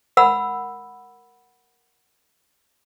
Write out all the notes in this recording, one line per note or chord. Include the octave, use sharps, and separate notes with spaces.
A#4 F#5 B5 E6